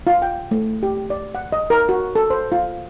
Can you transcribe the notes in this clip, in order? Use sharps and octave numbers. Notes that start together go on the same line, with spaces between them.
F4
G5
A3
G4
D5
F#5
D#5
A#4
F#4
A4
C5
F4